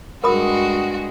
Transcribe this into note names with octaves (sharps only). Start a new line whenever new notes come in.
G2 G#3 F#4 G#4 A#4 B5 D#6